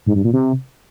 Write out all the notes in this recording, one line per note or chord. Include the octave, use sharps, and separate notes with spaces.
G#2
G2
A#2
C3